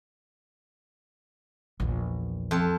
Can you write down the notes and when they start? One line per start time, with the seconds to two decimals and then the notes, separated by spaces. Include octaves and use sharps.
1.80 A#1 E2
2.51 F2 A4